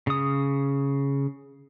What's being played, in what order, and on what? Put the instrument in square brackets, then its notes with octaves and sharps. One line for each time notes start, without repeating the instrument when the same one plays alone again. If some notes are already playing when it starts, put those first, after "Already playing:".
[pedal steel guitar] C#3 D#6